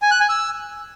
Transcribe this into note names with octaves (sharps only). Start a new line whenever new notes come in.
G#5
F#6
G#5
E6